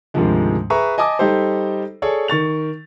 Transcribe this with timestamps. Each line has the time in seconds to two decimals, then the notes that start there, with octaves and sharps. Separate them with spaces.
0.14 D2 G#2 C3 D#3 F3 G#3
0.70 G#4 B4 E5 A#5 C#6
0.98 D#5 G#5 A5 D6 D#6
1.19 G3 D#4 G4 A4 C5
2.02 G#4 A4 C#5 D5
2.28 D#3 C#6 A6 F7